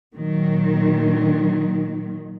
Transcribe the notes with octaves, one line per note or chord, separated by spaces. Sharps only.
A#2 D#3 F#3